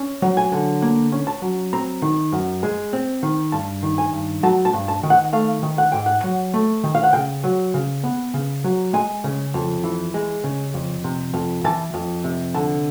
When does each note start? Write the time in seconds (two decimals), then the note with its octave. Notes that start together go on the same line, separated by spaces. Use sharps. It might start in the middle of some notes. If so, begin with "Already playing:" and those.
Already playing: C#4
0.22 F#3
0.37 G#5
0.52 D3
0.82 A#3
1.12 C#4
1.27 A5
1.42 F#3
1.73 C4 A#5
2.02 D#3
2.32 F#2
2.63 G#3
2.93 C4
3.23 D#3
3.52 G2 A5
3.83 D#3
3.98 G#5
4.13 G2
4.43 F#3 A5
4.65 A5
4.73 G2
4.88 A5
5.03 D#3
5.10 F#5
5.33 A3 F5
5.63 D#3
5.78 F#5
5.92 G#2 G5
6.06 F#5
6.24 F#3
6.54 A3
6.84 D#3
6.95 F5
7.03 F#5
7.13 C#3 G5
7.44 F#3
7.74 C#3
8.04 B3
8.34 C#3
8.64 F#3
8.93 G#3 G#5
9.24 C#3
9.54 F2
9.83 E3
10.14 G#3
10.44 C#3
10.74 F2
11.04 C3
11.34 F2
11.64 E3 A5
11.94 F2
12.24 C3
12.54 D3 A5